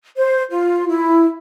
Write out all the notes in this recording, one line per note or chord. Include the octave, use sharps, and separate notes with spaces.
C5
F4
E4